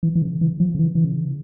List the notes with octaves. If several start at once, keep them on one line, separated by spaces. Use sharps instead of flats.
E3
E3
C#3
E3
F3
C#3
E3
E3
C#3